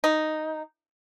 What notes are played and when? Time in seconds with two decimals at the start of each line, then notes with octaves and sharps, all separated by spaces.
0.04 D#4